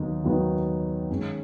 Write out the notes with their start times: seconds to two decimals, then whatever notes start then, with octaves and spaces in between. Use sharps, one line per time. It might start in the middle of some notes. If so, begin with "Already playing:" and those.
Already playing: D#2 D#3 F#3 B3 D#4
0.24 D#2 D#3 F#3 B3 D#4
1.09 D#2 D#3 G#3 C#4